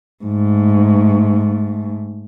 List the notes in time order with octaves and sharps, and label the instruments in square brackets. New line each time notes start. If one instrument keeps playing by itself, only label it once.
[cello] G#2 A3